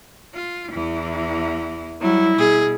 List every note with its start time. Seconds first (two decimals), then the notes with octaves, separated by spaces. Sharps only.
0.34 F4
0.72 E2 E3
2.02 F#3 G3 E4
2.38 B2 G#4